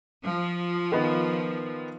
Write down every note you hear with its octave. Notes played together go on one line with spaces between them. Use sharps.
F3
D#3 B3 D#4